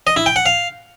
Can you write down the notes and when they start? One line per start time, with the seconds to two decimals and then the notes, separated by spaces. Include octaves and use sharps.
0.07 D#5
0.16 E4
0.26 G5
0.36 F#5
0.46 F5